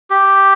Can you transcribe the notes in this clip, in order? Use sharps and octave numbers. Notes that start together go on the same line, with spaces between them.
G4